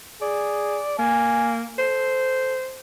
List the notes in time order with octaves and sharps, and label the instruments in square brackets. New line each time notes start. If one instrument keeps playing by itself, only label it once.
[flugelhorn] G#4 [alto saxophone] D5
[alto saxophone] A#3 [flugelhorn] G#5
[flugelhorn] A4 [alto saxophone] C5